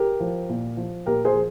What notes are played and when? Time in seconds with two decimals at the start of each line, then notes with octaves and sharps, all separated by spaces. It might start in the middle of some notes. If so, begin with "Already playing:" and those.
Already playing: G4 A#4
0.20 F3
0.49 A#2
0.77 F3
1.06 A#2 G4 A#4
1.25 G#4 C5
1.34 F3